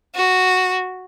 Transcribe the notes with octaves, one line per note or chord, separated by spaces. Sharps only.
F#4